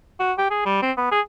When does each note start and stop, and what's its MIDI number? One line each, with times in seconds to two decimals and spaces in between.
0.20 0.33 66
0.38 0.49 67
0.51 0.62 68
0.66 0.81 55
0.82 0.92 60
0.97 1.11 59
1.12 1.21 68